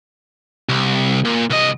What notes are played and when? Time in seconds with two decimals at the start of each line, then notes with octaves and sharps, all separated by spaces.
0.69 C2
1.25 A#2
1.50 C2 D#5